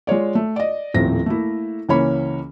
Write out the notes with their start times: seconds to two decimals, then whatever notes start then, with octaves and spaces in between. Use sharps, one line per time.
0.07 G#3 F4 C#5 D5
0.35 A3
0.56 D5 D#5
0.94 D#1 A2 F3 C4 A#6
1.26 A3 A#3 E4
1.89 C#2 E3 A#3 C#4 C#5 B5